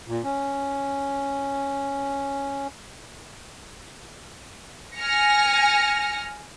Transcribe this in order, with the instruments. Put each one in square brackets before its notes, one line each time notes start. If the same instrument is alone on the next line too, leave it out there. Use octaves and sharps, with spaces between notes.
[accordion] A#2
C#4
[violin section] G#5 F6 A#6 C#7